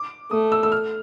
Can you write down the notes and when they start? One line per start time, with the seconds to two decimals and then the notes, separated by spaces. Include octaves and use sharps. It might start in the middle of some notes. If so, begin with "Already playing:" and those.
Already playing: D6
0.31 A3 D#6
0.52 E6
0.63 E6
0.72 F6